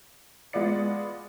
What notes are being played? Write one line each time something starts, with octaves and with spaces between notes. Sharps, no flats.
G#3 B3 F4 D5 C#7